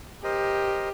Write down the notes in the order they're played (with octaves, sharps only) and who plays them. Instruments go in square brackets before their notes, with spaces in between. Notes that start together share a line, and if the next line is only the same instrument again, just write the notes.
[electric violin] G4 [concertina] A#4 C5 D#5